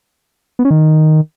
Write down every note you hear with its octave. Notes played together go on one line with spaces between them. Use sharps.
B3
C#4
D#3